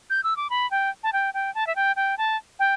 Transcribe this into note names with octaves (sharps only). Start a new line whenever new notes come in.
G6
E6
D6
B5
G5
A5
G5
G5
A5
E5
G5
G5
A5
G5